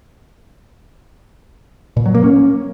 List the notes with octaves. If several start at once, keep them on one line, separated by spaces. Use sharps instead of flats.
A#2
F#3
A#3
C#4